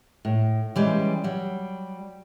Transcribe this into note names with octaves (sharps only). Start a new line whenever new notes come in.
A2
E3 G3 G#3 C#4
F#3 G3